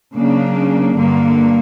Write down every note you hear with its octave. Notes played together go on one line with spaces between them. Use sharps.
C#3 F#3 A#3 D4
G2 D3 A#3